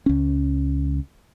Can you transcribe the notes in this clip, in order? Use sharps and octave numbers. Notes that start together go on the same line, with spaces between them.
C#2 C#4